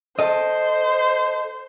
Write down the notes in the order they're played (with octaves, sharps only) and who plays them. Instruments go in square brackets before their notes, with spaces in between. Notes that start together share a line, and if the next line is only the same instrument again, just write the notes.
[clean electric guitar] A4 D#5 [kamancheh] C5